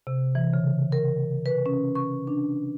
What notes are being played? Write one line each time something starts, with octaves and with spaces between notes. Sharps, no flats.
C3
E3
C#3
A#4
B4
C#4
C#6
D4